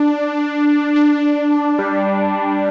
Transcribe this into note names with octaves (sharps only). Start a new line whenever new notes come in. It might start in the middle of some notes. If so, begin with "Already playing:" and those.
Already playing: D4
D4
G3